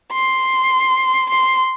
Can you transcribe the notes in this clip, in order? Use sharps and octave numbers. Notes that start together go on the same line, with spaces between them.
C6
C6